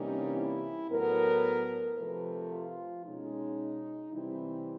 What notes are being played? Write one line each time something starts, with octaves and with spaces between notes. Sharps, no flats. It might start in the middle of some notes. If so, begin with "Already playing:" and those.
Already playing: C3 E3 G3 A#3 C#4 D#4
E4
A2 F#3 B3 A#4
C3 F3 A3 B4
F4
B2 G#3 C#4 D#4
C3 E3 G3 C4 E4